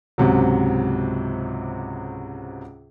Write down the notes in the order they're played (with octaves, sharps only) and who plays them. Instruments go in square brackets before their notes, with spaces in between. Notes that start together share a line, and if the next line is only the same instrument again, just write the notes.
[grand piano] C#2 G#2 C3 F#3